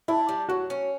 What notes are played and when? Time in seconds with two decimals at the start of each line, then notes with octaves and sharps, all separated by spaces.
0.08 D4 E4
0.29 G3
0.49 F#3 F#4
0.70 C#4